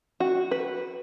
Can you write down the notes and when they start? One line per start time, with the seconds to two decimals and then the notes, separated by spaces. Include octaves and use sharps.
0.20 F#4
0.51 B4